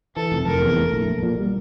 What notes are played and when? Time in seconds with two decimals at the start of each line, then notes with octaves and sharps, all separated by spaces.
0.16 E3 A4
0.32 F1
0.46 F1 A#4
0.62 E2
0.77 A3
0.92 A#1
1.08 A#1
1.23 A#2
1.39 G3